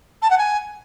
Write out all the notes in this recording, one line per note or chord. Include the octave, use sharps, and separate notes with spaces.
A5
F#5
G#5